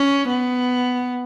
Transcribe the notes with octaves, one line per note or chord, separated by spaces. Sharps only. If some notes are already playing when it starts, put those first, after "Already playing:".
Already playing: C#4
B3